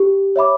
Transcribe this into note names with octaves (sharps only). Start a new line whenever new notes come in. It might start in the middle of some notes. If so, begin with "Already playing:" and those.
Already playing: G4
C#5 E5 B5 D6